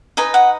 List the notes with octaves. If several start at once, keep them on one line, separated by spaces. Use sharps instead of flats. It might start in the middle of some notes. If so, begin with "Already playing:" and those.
D#4 B4 D#5 G#5
F#5